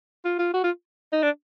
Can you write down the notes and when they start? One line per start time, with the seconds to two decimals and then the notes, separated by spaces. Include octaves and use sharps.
0.25 F4
0.39 F4
0.54 F#4
0.64 F4
1.13 D#4
1.23 D4